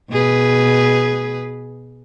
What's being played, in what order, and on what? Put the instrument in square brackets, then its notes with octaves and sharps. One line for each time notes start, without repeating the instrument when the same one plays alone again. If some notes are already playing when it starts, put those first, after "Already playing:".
[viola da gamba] B2 G#4 B4